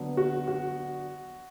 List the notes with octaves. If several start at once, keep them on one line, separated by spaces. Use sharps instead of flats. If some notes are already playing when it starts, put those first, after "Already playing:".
Already playing: D3 F#3 B3 D4
F#4
F#4